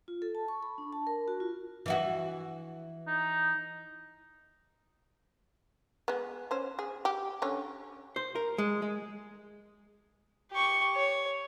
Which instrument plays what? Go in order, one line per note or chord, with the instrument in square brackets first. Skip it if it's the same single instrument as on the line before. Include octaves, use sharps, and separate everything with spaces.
[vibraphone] F4
A4
A5
C#6
B5
D4
A5
A#4
F#4
F4
[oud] E3 E4 F#4
[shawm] D#4
[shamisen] G#3 B3
C#4 C5
G#4
G4
D3 C#4
[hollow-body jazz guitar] C5
A#4
G#3
G#3
[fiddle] G4 C#6
C#5